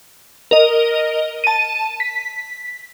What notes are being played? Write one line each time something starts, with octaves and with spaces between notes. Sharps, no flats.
A#4 D#5
A5 D#7
B6